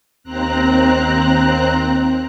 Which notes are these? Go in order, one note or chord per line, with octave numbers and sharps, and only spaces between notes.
D#2 C4 A#5 F#6